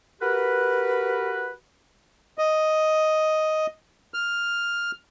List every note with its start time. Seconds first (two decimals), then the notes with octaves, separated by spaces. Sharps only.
0.22 F#4 G4 A#4 B4
2.38 D#5
4.14 F6